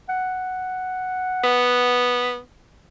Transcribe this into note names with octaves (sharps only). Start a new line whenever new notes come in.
F#5
B3